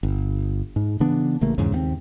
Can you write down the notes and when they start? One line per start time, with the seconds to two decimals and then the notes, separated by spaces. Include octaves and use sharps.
0.03 G1
0.76 G#2
1.00 C#3 E3 B3 D4
1.41 A1 C#3 A3 A#3
1.58 E2 G#2 C#3
1.72 D#2 B3 C4